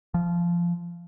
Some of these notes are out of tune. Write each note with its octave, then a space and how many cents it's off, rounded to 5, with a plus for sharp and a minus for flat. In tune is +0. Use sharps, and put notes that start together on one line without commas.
F3 -15